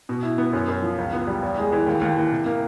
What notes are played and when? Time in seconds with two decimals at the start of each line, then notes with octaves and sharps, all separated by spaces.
0.09 B2
0.23 E4
0.38 B3
0.53 F#2
0.68 F#2
0.82 F3
0.98 C#2
1.13 B3
1.27 G3
1.43 E2
1.58 G#3
1.72 E3
1.87 D#2
2.01 D#2
2.17 E3
2.32 C3
2.46 A#3